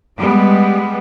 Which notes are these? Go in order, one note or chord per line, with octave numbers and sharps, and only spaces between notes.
G3 G#3 B3